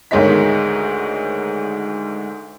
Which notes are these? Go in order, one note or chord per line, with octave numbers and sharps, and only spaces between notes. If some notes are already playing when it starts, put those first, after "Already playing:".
D2 G#2 D#3 C#5 D#5 B6